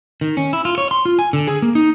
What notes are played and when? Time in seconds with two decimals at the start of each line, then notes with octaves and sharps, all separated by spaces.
0.21 D#3
0.37 C#4
0.53 E4
0.65 F4
0.78 C#5
0.91 C6
1.05 F4
1.19 G#5
1.33 D3
1.48 G#4
1.62 A#3
1.75 D#4